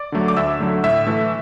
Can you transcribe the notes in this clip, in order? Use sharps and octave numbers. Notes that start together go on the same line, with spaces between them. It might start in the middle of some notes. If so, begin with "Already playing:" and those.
Already playing: D5
D3 F#3 A3
D6
D2 E5 E6
D3 F#3 A3
A2 E5 E6
E3 A3